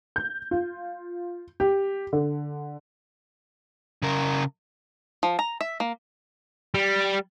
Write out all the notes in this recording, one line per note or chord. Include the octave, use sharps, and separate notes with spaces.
G6
F4
G4
D3
C#3 A#4
F3
A#5
E5
A#3
G3